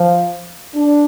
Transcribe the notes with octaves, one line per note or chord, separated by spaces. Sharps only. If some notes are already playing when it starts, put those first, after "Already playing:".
Already playing: F3
D4